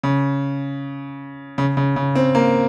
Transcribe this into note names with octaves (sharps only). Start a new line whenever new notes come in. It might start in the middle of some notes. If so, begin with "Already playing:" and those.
C#3
C#3
C#3
C#3
C4
A#3